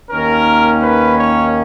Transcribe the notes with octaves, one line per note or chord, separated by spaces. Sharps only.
D#2 D#3 A#3 C#4 A#4
B4
C#5